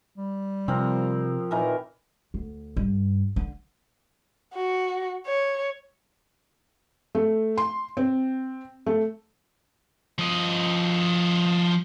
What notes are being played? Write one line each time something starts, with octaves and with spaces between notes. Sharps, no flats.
G3
C3 F3 C4 A#4
A#2 D#3 E3 A#4
D2
G2
D3
F#4
C#5
A3
C6
C4
A3
F3 D#5